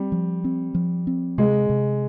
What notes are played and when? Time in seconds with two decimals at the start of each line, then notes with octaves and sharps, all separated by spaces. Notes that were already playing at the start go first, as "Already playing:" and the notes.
Already playing: G3 C4
0.12 F3
0.44 C4
0.75 F3
1.07 C4
1.38 C3 G#3
1.70 C3